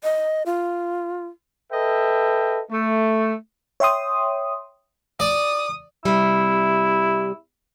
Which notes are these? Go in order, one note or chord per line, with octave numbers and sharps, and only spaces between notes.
D#5
F4
A4 B4 D#5 E5 G5
A3
C#5 E5 G5 C6 D#6
D5 D#6
C3 G3 E4